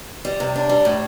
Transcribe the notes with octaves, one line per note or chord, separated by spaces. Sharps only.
G3
C3
D4
G3
A2